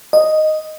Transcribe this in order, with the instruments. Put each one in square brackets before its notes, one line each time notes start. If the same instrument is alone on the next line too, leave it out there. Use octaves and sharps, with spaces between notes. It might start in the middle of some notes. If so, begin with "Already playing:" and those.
[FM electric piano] D#5